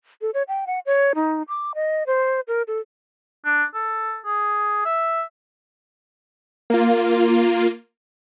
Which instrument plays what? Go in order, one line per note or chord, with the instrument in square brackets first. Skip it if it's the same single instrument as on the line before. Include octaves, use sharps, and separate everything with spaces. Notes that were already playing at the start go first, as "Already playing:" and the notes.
[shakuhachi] A4
C#5
G5
F#5
C#5
D#4
D6
D#5
C5
A#4
A4
[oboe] D4
A4
G#4
E5
[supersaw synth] A#3 F4